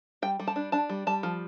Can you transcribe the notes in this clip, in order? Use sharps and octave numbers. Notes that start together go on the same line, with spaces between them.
G3 G5
G3
A5
D4
D4 A5
G3
G3 A5
F3